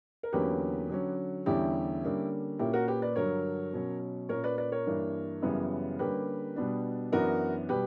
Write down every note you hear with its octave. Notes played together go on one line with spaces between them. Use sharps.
A#4
E2 D3 F#3 A#3 C#4 G4 B4
D3 F#3 C#4
E2 D3 G3 C#4 E4 G4
D3 G3 A#3 C#4
A#2 A#3 C#4 E4 G4
F#4 A#4
G4 B4
B4 D5
G2 D3 F#3 A#4 C#5
B2 F#3 C#4
A#2 A#3 C#4 A#4 C#5
B4 D5
B4 D5
A#4 C#5
G2 E3 A#3 D4
F#2 C#3 E3 G3 B3
D3 G3 A#3 C#4 G4 B4
B2 G3 B3 D4
F#2 E3 B3 D4 F#4 A#4
B2 G3 G4 B4